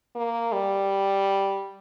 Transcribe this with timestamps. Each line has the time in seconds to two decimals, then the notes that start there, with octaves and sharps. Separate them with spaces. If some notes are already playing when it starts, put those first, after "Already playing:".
0.15 A#3
0.52 G3